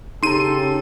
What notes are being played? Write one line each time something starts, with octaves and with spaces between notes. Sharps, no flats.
C#3 D#4 G4 A4 A#5 C6 D#7